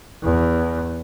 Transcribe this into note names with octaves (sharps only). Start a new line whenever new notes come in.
E2